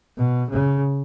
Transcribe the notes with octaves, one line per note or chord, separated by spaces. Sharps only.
B2
C#3